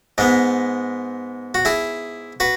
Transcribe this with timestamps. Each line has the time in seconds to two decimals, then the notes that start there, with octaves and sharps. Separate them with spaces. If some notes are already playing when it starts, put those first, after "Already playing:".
0.18 G#2 G#3 B3
1.55 F#4
1.65 E4 G#4
2.40 F#4 B4